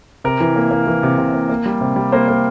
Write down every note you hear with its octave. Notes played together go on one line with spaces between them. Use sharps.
C3 A#4
E3
A#3
A#3
E3
C3
C3
A#3
A#3
G3
C3
G3
A#3 C5
A#3